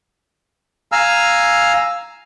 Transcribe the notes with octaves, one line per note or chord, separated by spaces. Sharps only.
F5 G#5 A#5 E6 F6